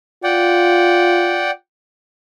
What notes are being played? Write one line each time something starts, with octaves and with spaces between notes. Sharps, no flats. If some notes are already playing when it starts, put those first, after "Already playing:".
F4 D5 F#5 G5